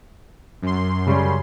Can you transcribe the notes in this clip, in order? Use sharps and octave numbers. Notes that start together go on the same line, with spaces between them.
F#2 C6
C#3 G3 C#4